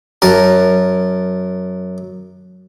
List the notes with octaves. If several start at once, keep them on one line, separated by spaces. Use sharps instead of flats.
F#2 A#4 A5